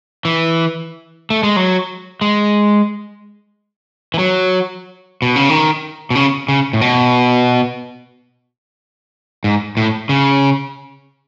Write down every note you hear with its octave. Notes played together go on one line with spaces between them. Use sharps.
E3
A3
G#3
F#3
G#3
E3
F#3
B2
C#3
D#3
B2
C#3
C#3
A2
B2
G#2
A2
C#3